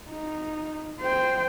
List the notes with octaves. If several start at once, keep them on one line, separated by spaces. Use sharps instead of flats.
D#4
C5 G5